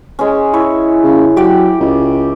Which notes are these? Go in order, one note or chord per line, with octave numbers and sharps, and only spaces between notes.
G#3 C#4
E4 C#5
C#3
F#3 G4 D5
C#2